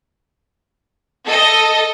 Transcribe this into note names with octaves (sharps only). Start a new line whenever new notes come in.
A4 D#5